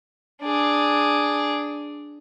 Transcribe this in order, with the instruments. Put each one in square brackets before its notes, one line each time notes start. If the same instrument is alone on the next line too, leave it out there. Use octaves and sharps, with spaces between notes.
[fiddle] D4 G#4